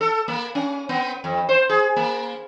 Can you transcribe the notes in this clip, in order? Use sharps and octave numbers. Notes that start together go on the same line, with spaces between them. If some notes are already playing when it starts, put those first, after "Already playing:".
A4
A#3
C#4
B3
F2
C5
G#4
A#3